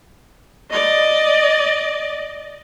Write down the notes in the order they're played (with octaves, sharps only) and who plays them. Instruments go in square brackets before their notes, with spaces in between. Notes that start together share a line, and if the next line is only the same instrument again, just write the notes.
[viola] D5 D#5